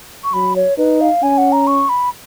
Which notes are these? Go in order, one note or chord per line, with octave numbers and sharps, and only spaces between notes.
C#6
F#3 B5
C#5
D#4 B4
F5
C#4 G#5
F#5
A#5
C#6
B5